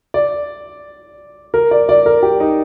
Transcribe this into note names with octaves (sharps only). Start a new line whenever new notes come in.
D5
A#4
D5
D5
A#4
G4
D#4